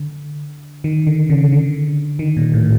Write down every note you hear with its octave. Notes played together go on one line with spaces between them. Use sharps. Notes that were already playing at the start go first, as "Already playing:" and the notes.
Already playing: D3
D#3
D3
C#3
D3
D#3
A#2
A2